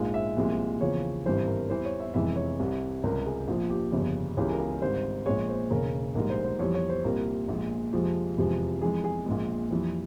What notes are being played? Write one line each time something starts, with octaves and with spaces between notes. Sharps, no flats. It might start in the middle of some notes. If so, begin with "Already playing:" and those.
Already playing: A#1 G#2 F3 G#3 F5
E5
C2 A#2 F3 G#3
E2 C#3 F3 C#5
G#1 G2 E3 C5
A#4
E2 E3 G3 C5
C#5
E5
F1 F2 E3 G#3 E5
C#5
C2 C3 G3
C#2 C3 G3 A#4
G#4
A#1 A#2 F3
G4
G1 F2 C#3 G3
C#2 C#3 E3 G#3 G4
A#4
G#4
G#1 G#2 G3 C5
A#1 A#2 G#3 C#5
C5
E1 E2 C#3 A#4
A#1 G#2 G3 A#4
C5
C5
F2 E3 G3 C#5
C#5
C5
C2 A#2 G3 A#4
A#1 A#2 G#3
F2 C3 F3 G#3
F1 E2 C3 F3 G#3
F2 E3 G#3 G#4
G#4
A#1 A#2 G#3
F2 E3 G3